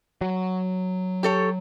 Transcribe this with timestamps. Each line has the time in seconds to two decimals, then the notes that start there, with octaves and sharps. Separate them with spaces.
0.21 F#3
1.23 G4 A4 C#5